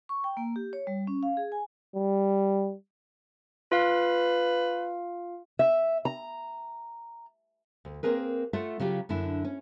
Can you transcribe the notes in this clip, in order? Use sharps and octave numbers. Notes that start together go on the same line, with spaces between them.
C#6
G5
A#3
G4
C#5
G3
C#4
F5
G#4
G#5
G3
F4 B4 F5
E5
A#5
D2
A#3 C4 G#4 A#4 B4
A3 F4 A4 E5 F#5
C#3 F#3 F4 G4
F#2 D3 D4 E4
C#4